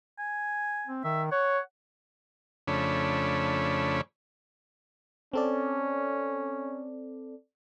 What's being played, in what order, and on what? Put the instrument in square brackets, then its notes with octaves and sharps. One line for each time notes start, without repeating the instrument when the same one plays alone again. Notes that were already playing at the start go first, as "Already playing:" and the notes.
[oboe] G#5
[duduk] C4
[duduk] D#3 [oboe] E5
[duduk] C#5 [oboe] F#5
[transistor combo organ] F2 C#3 A3 D4 C#5 B5
[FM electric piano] C4 A4 D5 [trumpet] C#4